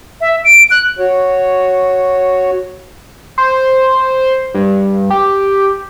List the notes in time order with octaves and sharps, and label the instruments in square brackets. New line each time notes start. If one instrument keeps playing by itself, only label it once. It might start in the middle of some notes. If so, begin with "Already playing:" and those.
[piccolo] E5
D7
F#6
[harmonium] F#4 C#5
[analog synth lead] C5
G2
G4